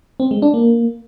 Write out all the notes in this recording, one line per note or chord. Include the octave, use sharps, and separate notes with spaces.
C4
G#3
D4
A#3